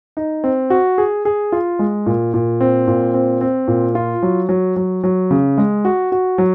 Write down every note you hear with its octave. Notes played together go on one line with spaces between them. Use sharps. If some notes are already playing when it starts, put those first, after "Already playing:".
D#4
C4
F#4
G#4
G#4
F4
G#3
A#2
A#2
C4
A#2
C4
C4
A#2
F4
F#3
F#3
F#3
F#3
C#3
G#3
F#4
F#4
F#3